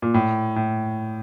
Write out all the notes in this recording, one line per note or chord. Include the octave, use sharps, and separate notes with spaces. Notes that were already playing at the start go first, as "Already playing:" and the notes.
A#2
A2
A2